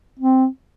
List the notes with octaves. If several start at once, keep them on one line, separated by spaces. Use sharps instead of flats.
C4